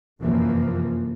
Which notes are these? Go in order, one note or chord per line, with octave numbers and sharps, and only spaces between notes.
F1 F#2 E3 F3 A#3